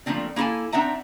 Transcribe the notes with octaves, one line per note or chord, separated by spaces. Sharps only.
F3 A3 A#3 C4 D4
A#3 E4 F#4 A4 G#5
C4 D4 D#4 E5 F#5 A#5